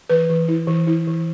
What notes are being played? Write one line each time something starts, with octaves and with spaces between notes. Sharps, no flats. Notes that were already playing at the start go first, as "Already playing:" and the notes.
E3 B4
E3
E4
E3
E4
E3